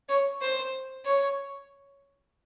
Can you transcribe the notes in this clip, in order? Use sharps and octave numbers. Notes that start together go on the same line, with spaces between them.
C#5
C5
C#5